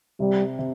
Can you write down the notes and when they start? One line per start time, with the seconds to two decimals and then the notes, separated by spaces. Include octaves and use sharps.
0.20 C3 G3
0.59 C3